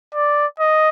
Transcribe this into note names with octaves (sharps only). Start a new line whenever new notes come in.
D5
D#5